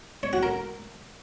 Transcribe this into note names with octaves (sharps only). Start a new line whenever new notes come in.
C#5
F#4
A#4